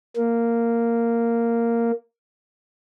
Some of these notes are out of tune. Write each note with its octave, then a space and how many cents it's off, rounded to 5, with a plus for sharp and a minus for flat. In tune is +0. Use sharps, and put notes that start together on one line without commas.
A#3 -5